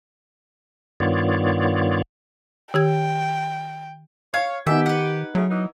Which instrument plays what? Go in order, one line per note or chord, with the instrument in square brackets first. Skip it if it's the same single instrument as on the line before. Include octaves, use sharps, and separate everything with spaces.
[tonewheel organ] G2 D#3 B3 F4 C#5 D5
[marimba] D#3 G4 G#6 [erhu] G5
[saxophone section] C#5 [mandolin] F5 [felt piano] G#6
[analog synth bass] D#3 [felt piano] B3 D#4 G#5 [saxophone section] G4 [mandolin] E5
[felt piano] D#4 [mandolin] B4 F#5
[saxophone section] C#3 A3 [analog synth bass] F#3
[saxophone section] E3 B3 D#4